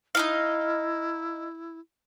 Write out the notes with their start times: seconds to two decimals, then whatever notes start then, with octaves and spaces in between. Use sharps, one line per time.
0.15 D#4 E4 D#5 F5